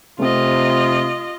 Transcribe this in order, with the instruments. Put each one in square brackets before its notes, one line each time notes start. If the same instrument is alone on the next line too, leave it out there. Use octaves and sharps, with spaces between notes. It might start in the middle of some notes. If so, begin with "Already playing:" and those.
[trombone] C3 [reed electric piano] A3 C4 [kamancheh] F4 D#5